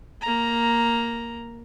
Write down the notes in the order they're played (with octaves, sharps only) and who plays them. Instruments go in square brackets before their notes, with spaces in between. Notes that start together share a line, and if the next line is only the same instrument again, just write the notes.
[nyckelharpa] A#3 A#5